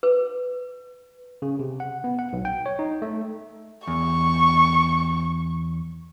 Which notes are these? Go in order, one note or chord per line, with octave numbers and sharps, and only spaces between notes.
B4
C#3
C3
F#5
B3
F#5
B1
G5
C#5
D#4
A3
E2 C#6